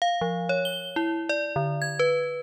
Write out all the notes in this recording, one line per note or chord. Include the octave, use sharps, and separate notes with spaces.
F5
F3
C#5
G7
E4
D5
D3
G#6
B4